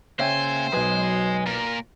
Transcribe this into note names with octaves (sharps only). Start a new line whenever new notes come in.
C#3 A#3 C5 C#5 E5 G5 G#5
B1 F#3 B4 D#5 G#5
A#2 A#4